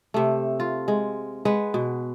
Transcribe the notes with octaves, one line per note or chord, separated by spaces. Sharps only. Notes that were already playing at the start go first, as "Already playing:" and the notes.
C3 A3
F4
G#3
G#3 B4 F#5
B2